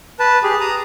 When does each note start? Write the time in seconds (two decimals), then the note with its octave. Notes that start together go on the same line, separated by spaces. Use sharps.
0.19 B4 A5
0.43 G4 G#4
0.61 A#5 D#6